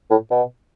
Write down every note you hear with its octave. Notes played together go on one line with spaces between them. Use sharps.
A2
B2